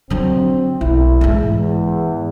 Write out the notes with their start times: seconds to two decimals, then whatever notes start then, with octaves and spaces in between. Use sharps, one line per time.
0.10 D3 F#3 C4
0.81 B1 E4
1.21 G#2 E3
1.59 E2